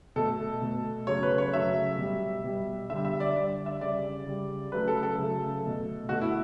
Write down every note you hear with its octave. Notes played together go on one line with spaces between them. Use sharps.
B2 A3 A4
B2 A3
C#3 F#3 A3 C#5
B4
C#5
C#3 F#3 A3 E5
B2 G3
B2 G3
D3 G3 E5
E5
D5
D3 G3 D5
E5
C#3 G3 D5
C#3 G3
C#3 F#3 A3 B4
A4
A4
C#3 F#3 A3
B2 A3
B2 A3 F#4
E4